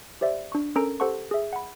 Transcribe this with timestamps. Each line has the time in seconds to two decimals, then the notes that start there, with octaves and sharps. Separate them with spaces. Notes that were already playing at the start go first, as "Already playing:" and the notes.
0.21 G4 C5 D5 E5
0.52 D4 C#6
0.76 C#4 A4 A#4 A#5 D7
1.00 G4 A4 C5 F#5 A5 C#6
1.31 G#4 E5
1.53 F#5 B5